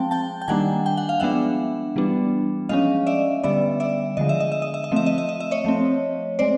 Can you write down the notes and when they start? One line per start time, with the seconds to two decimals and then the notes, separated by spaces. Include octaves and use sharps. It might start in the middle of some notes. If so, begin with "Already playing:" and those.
Already playing: F3 G#3 C4 G5 A5
0.11 G5 A5
0.42 G5
0.48 D#3 G3 A#3 D4 F#5 G#5
0.86 G5
0.97 F#5
1.09 F5
1.20 F3 G#3 B3 D4 E5 F#5
1.96 E3 G3 B3 D4
2.69 F3 G#3 C#4 D#5 F5
3.07 D5 E5
3.43 D3 G3 B3 D5 E5
3.80 D5 E5
4.17 D3 F3 G#3 D#5
4.29 E5
4.40 D#5
4.52 E5
4.62 D#5
4.74 E5
4.84 D#5
4.92 F3 A3 C4 E5
5.06 D#5
5.18 E5
5.29 D#5
5.40 E5
5.51 C#5 D#5
5.65 F3 A3 C4
6.39 G#3 C4 C5 D5